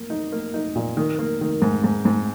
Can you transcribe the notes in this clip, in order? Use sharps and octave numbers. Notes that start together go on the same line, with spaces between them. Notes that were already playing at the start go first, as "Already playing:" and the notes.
Already playing: A#3
D#4
A#3
D#4
A#2
D#3
A#3
D#3
G#2
G#2
G#2